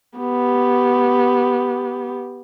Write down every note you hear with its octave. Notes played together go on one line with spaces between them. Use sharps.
B3 G4